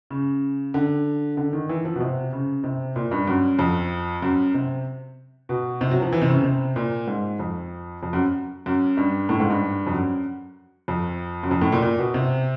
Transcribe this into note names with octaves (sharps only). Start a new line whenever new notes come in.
C#3
D3
D3
D#3
E3
F3
B2
C3
C#3
C3
A#2
G2
F#2
F2
F#2
C3
B2
C3
F#3
F3
E3
C3
C#3
C3
A#2
G#2
F2
F2
F#2
F#2
G2
A2
G#2
G2
F2
F#2
F2
F#2
F2
A2
A#2
A#2
B2
C3